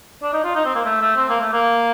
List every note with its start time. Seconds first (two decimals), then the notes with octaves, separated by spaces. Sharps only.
0.23 D4
0.33 D#4
0.44 F4
0.55 D#4
0.65 C4
0.75 A#3
0.85 A3
1.02 A3
1.17 C4
1.29 A#3
1.40 A3
1.53 A#3